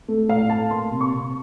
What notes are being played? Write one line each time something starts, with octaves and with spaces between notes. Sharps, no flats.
A3
A2 F5
A3 A5
A#3 C6
C3
C#6
C3